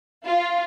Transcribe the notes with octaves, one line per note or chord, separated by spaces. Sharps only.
F4